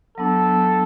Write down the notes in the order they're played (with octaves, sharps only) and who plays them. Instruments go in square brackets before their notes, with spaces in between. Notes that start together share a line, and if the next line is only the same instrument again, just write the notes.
[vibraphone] F#3 B3 D4 [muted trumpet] A4